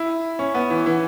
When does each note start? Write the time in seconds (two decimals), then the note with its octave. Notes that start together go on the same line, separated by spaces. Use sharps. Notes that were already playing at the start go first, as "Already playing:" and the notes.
Already playing: E4
0.39 C#4
0.55 B3
0.70 E3
0.86 E3